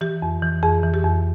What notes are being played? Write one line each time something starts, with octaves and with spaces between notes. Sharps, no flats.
E3 G4
F2
E3
F2 G#4
E3
G4
F2